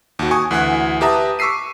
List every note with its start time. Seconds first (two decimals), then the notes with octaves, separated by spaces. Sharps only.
0.19 D#2 F#4
0.31 G#5 C#6 D#6
0.51 D2 E3 F#5 G#5 F#6
1.01 G4 B4 E5 A5 A#5 D#6
1.39 C#6 D6 E6 B6 C7 D#7